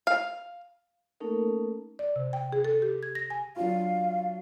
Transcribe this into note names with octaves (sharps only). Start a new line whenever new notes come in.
F5
A3 A#3 C#4 D#4 A4 A#4
D5
C3
G5
G#4
A4
G4
G#6
A#6
G#5
F#3 D4 F4 F5